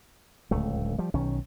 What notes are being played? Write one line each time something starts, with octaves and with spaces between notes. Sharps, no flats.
D1 C#2 A3
F3 G3
B1 D#3 C#4